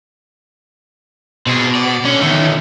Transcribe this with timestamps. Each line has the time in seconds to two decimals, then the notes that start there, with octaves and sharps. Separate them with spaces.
1.47 B2 C4 G#4
1.75 D5
2.05 D3 C#4
2.21 B1 D3 D#3 A3